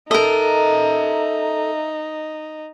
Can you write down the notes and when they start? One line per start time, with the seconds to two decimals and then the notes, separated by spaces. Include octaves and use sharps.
0.11 D#4 A4 A#4 D#5 E5 A#5